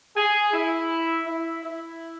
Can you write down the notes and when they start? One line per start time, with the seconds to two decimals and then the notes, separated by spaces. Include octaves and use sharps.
0.16 G#4
0.53 E4
1.27 E4
1.64 E4